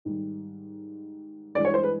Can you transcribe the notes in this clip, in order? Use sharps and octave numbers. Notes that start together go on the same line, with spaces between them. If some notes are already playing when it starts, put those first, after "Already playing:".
G#2 D#3 G3
G2 E3 G#3 D5
C#5
C5
B4